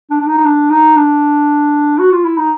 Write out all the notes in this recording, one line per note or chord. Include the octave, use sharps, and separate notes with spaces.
D4
D4
D#4
D#4
D4
D#4
D4
F#4
F4
E4
D#4